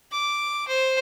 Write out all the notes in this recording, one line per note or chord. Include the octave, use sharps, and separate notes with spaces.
D6
C5